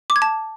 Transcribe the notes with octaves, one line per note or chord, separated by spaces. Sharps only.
D6
G#6
A5